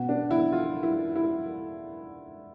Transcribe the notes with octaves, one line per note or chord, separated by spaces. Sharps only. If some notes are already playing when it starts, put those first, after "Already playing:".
Already playing: B2
D4
E4
F4
E4
E4